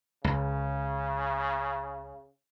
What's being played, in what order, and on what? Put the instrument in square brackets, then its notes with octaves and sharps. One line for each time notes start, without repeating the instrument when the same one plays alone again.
[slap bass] C#2 [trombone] C#3